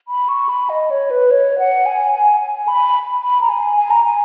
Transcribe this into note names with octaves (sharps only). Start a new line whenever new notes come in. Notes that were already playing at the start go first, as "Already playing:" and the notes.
B5
C#6
B5
D#5
C#5
B4
C#5
F#5
G#5
G#5
G#5
B5
B5
A#5
G#5
G#5
A#5
G#5